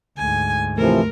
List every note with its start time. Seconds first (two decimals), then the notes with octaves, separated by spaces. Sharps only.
0.18 D2 G#2 G#5
0.78 C3 E3 F3 A3 A#4